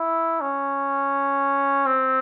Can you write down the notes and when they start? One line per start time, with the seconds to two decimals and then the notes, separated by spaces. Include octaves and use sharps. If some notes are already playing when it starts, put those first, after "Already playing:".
Already playing: E4
0.41 C#4
1.86 C4